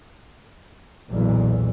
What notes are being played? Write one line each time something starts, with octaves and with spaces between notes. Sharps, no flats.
B1 E2 A#2